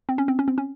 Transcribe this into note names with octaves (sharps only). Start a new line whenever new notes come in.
C4
C#4
C4
C#4
C4
C#4